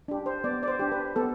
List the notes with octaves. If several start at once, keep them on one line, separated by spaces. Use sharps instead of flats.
D4 G4
C5
B3 D5
D5
C5
D4 G4
B4
B3 A4